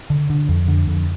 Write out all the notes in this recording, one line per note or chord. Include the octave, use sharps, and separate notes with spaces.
D3
D3
F2
D3
F2